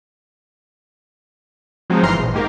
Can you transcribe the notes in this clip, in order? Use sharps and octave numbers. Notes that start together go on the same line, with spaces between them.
F3 F#3 G#3 C4 D#4
G1 E3 A#5 C6 F6 C7
A#1 B2
G#2 D#3 A#3 G4 A#4